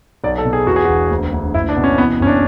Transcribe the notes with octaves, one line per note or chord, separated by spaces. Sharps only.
B1 D5
A4
B2
G#4
E2 F#4
G#4
E1 F#4
D2
D2
F#1 E4
D4
B2
C#4
E3 B3
F#1 C#4
D4